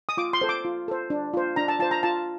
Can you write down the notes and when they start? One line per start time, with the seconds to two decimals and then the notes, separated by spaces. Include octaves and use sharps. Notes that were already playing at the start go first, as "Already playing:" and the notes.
0.09 D#6
0.17 F4 D6
0.33 C6
0.41 A4 C5
0.49 D6
0.65 F4
0.88 A4 C5
1.10 D4
1.33 F4 C5
1.56 D4 A#5
1.68 A5
1.80 F4 C5 A5
1.91 A#5
2.03 F4 A5